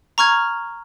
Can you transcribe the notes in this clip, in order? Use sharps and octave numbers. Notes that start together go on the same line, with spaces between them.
A#5 C#6 F6 G#6